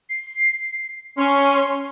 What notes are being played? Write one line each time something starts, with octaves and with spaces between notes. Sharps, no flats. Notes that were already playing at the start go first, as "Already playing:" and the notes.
C7
C#4 C6